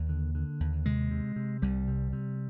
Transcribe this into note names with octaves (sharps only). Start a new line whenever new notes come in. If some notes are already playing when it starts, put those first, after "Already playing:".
Already playing: D#2 A#3
D3
D3
D#2
C3 G#3
C3
C3
C2 G3
C3
C3